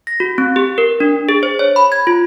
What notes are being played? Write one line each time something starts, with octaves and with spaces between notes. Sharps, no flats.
A#6
F#4
C4
G4
A#4
D4
G#4
C5
C#5
B5
G#6
F4